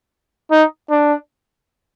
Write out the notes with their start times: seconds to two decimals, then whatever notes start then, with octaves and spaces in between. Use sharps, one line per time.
0.51 D#4
0.90 D4